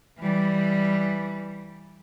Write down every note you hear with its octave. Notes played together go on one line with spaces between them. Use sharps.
E3 G3